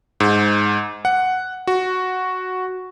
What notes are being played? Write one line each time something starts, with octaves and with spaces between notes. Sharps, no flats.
G#2
F#5
F#4